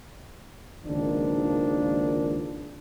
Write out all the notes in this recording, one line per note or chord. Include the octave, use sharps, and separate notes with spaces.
G#1 C#2 D#3 F3 A#3 D4